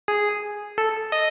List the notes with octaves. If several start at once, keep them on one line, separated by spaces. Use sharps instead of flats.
G#4
A4
D#5